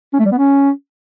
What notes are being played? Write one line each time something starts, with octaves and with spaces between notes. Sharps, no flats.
C#4
A3
G3
B3
C#4